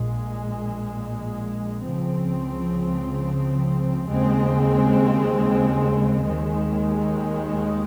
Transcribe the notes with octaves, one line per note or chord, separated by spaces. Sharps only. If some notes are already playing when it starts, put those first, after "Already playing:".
Already playing: A#1 A#2 G#3
C#2 C#3 F3 C4
D#2 C#3 G#3 C4
D#2 D#3 G#3